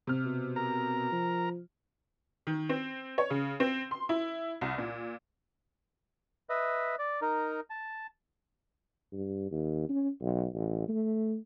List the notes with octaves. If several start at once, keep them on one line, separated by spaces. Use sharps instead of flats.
C3 F6
B2
A#4 A#5
F3
D#3
C4
C#5
C#3
C4
C6
E4
C2
A#2
B4 D#5 E5
D5
D#4 A#4
A5
G2
D#2
C#4
B1
A1
A3